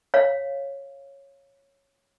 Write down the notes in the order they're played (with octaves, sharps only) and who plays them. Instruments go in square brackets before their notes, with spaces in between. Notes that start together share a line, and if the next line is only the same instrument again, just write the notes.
[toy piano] C#5 F5